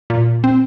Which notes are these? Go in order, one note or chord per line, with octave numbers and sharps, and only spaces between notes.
A#2
C4